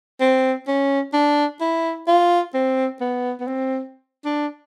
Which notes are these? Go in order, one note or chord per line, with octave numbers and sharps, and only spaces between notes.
C4
C#4
D4
E4
F4
C4
B3
B3
C4
D4